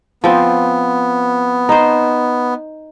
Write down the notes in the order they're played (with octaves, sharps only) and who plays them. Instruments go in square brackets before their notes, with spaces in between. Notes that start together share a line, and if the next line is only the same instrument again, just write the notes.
[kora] F3 C4 [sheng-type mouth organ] B3
[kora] D#4 C5